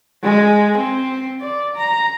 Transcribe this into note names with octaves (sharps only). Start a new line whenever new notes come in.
G#3
C4
D5
A#5